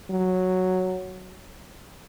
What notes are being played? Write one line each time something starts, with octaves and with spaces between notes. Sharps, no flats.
F#3